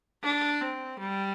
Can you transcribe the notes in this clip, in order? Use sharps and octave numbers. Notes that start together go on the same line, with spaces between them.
D4
C4
G3